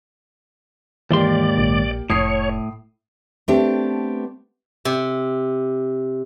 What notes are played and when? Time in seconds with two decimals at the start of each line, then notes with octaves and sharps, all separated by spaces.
1.11 D#2 G#2 E3 A#3 G4 D5 C6
1.58 A#1
2.10 F1 A2 C#5 D#6 C7
3.48 A3 B3 C4 D4 G4
4.85 C3